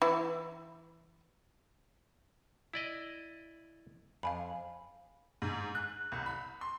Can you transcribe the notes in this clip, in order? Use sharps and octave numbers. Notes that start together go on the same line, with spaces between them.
E3 E4
E4 D5 D#5
F2 F5 G#5 B5
G#2
F#6
C2
B5
C6